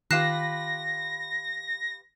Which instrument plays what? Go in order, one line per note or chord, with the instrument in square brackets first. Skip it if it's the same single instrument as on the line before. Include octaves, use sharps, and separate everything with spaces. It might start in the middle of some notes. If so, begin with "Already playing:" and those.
[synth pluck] D#3 [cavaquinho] F4 G4 B4 [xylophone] F#6 C7 E7 [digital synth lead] A#6